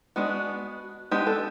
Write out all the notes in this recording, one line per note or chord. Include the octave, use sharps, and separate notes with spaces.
G#3 B3 D4 F#4
G#3 B3 D4 G4
A4